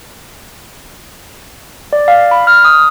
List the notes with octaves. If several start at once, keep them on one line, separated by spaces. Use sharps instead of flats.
D5
F5
B5
F6
D#6